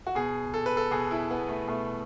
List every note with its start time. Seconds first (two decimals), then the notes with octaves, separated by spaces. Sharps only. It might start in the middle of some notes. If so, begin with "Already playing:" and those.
0.07 F#4
0.15 B2 G#4
0.54 A4
0.66 B4
0.77 A4
0.91 B2 G#4
1.11 E4
1.31 B3
1.48 A3
1.68 B2 A3